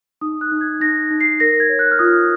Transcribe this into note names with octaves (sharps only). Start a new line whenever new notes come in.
D#4 D#6
F#6
D#4
G#6
D#4 A#6
D#4
C7
A#4 A#6
G#6
C#5
F#6
F6
F4 D#6